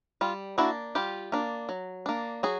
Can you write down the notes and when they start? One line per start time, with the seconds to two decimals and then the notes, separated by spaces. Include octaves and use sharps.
0.21 G3 F4
0.58 A#3 D4 E4 F#4
0.95 G3 F4 G4
1.32 A#3 D4
1.69 F#3
2.06 A#3 D4
2.43 F#3 F#4 G#4